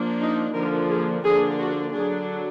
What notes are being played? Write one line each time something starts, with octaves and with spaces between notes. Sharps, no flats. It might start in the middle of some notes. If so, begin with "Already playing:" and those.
Already playing: F3 A#3 D4
D#4
D3 F3 A#3 D4 A#4
G#4
D3 F3 A#3 D4 G#4
F#4
D3 F#3 D4 G#4